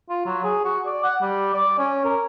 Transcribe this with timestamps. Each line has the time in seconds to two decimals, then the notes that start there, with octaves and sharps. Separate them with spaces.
0.10 F4
0.26 F#3
0.44 G#4
0.65 F#4
0.86 D5
1.04 F#5
1.22 G3
1.54 D5
1.78 C#4
2.05 A#4